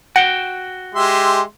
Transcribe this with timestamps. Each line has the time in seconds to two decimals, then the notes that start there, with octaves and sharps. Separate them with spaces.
0.16 F#4 F#5 G5
0.95 G#3 G4 E5 C6